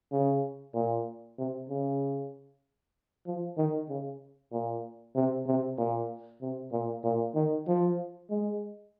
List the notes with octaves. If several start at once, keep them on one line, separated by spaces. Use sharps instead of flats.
C#3
A#2
C3
C#3
F3
D#3
C#3
A#2
C3
C3
A#2
C3
A#2
A#2
D#3
F3
G#3